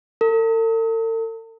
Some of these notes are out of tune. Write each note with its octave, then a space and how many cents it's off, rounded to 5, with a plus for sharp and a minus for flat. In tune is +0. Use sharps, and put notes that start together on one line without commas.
A4 +45